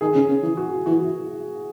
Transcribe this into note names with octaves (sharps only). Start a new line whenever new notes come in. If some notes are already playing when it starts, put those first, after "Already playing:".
D#3 G#4
C#3
C#3
E3
F#4
E3 F#4